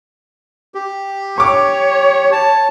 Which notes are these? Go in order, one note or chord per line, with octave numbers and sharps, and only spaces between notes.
G4
C#5 C#6 D6
A5